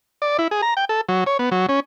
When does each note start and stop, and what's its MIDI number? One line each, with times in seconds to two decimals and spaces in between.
0.22 0.37 74
0.39 0.48 64
0.51 0.61 68
0.62 0.74 82
0.77 0.85 79
0.89 1.01 69
1.09 1.24 54
1.26 1.37 73
1.39 1.50 59
1.51 1.66 54
1.69 1.80 61